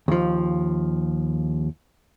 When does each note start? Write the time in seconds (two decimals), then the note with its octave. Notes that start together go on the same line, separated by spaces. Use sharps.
0.08 D#2 F3